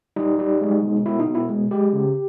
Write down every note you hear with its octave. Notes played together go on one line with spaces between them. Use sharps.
G3 D#4
G3
G#3
B2
B2 E4
D#4
B2
E4
G#3
G#3 G4
C#3